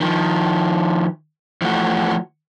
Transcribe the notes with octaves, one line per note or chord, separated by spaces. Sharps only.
D#3 F3
E3 F3 A3 F#4